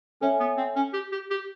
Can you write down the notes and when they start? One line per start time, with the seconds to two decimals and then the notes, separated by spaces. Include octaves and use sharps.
0.21 C#4 A4 C#5 E5 G#5
0.40 B3
0.57 C4
0.76 C#4
0.93 G4
1.12 G4
1.30 G4